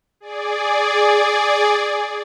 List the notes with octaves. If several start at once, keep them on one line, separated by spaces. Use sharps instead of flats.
G#4 D5